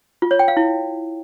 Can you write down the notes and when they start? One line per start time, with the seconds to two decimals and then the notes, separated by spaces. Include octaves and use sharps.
0.22 F4
0.31 C#5
0.39 G5
0.48 F5
0.57 E4